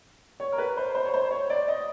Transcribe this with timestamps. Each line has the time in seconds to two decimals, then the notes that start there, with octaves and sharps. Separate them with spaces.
0.40 C#5
0.52 A#4
0.58 B4
0.77 C5
0.95 C5
1.05 C#5
1.14 C5
1.31 C#5
1.50 D5
1.68 D#5